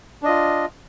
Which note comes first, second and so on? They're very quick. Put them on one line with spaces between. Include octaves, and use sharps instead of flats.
D4 D#5 F4